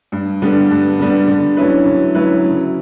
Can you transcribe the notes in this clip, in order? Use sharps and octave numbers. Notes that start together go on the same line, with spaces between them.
G2
D3 G3 B3
G2
D3 G3 B3
D3
F#3 C#4 E4 B4
D3
F#3 C#4 E4 B4
C#3